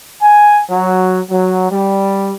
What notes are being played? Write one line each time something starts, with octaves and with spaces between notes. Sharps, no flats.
G#5
F#3
F#3
G3